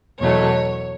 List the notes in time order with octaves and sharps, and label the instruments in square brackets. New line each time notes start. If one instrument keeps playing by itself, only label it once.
[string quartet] E2 B2 F#3 A3 C#5